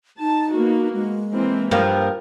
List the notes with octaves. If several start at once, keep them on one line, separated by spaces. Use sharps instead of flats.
D#4 A5
A#3 B3 F#4
G#3
E3 A#3 C4
G2 F3 A#3 A#4